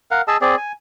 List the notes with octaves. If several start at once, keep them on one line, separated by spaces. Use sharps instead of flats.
A#4 F5 F#5
G#4 D#5 A5 E6
C4 G#4 D5
G#5